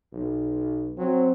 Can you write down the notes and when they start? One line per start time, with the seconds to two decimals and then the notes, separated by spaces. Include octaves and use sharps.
0.13 B1
0.98 F#3 C4